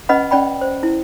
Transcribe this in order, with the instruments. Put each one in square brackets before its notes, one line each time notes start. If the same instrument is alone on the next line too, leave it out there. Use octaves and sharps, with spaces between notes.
[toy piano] C#4 B4 D#5 F#5 B5
C#4 D5 G5 B5
C5
E4